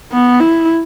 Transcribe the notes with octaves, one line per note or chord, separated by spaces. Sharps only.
B3
E4